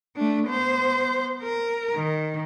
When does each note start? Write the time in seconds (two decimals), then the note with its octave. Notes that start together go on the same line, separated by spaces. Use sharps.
0.16 A3 D4
0.47 B3 C5
1.43 A#4
1.95 D#3